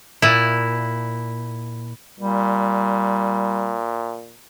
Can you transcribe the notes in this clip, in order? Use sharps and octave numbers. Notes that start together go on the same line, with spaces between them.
A#2 E4
A#2 G3